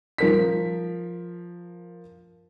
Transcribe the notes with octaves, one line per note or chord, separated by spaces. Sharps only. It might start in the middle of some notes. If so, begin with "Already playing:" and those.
F3 A#4 B6